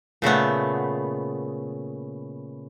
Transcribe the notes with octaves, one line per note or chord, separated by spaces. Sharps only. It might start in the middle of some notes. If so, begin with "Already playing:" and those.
A#2 C#3 A3 B3